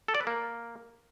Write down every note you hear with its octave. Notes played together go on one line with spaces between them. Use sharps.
A4
D5
B4
A#3